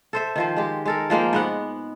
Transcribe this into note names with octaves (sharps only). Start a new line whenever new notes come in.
A4 C5 E5
D#3 F3 C5
G#3 G4
G#3 A4 A#4
F3 G#3 A#3 G5
G#2 B3 F#5